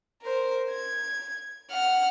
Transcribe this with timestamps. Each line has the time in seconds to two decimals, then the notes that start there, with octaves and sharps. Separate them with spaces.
0.24 A#4 C5
0.70 G#6
1.70 F#5 F6